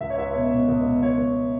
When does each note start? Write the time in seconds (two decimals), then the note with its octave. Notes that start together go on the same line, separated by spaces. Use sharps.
0.01 C#2 E5
0.10 C#5
0.18 C#2 E5
0.34 B2 C#5
0.51 B2
0.68 C#2
0.85 B2
1.01 C#2 C#5
1.18 C#2